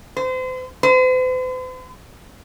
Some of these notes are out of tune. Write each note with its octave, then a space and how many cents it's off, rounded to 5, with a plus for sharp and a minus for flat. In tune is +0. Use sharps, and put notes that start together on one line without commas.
C5 -35
C5 -45